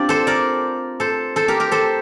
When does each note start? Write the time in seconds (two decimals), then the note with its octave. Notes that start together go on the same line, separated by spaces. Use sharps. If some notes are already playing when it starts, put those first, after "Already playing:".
Already playing: C4 D4 F4 G4 D5
0.09 A4 C5
0.27 A#4 D5
1.00 A4 C5
1.36 A4 C5
1.48 G4 A#4
1.60 G4 A#4
1.71 A4 C5